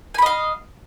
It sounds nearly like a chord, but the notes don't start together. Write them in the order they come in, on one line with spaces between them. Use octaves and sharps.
G#5 B5 D#5 F5